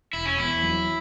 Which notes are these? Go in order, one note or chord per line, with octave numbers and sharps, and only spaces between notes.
E1 E4
C#4
E2 E4
F#3